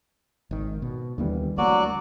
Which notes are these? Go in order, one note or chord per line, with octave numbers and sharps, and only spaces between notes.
G#1 D#3
B2
D#2 D3 E3 G3 A#3 B3
D2 F#3 A#3 F#4 D5